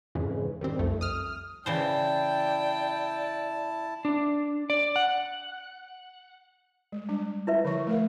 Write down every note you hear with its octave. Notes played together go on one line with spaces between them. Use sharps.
F2 G#2 C#3 E3
D#3 G3 C4
C2 F2 A3
D#6 F6
C#3 E3 E4 C5 D5 G5 A5
D4
D5
F#5
G#3
G3 D4
E4 B4 E5
D3 F3 C#6
A3 A#4 F5